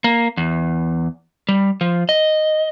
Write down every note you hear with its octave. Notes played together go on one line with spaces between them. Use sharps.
A#3
E2
G3
F3
D#5